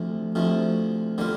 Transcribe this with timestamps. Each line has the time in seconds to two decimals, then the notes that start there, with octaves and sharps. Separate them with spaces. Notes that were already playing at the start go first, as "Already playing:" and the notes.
Already playing: D2 C3 F3
0.35 D2 C3 F3
1.18 D3 G3 A#3 F4